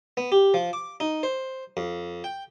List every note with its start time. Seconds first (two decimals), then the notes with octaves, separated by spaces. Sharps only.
0.17 B3
0.32 G4
0.54 F3
0.73 D6
1.00 D#4
1.23 C5
1.77 F2
2.24 G5